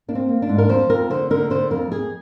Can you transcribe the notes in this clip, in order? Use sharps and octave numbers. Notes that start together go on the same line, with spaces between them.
A#3 D4
C4
A#3
D4
G#2
A#4
F2 C5
F2 A#4
D3 C5
D3 A#4
D3 C5
F2 A#4
F2 G#4